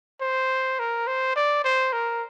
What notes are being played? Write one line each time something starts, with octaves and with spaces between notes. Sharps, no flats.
C5
A#4
C5
D5
C5
A#4